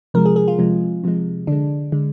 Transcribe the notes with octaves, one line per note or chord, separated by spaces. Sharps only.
C3 F3 G#3 A#4
G#4
G#4
F4
C3 F3 G#3
C3 F3 G#3
D3 G#3 D4
D3 G#3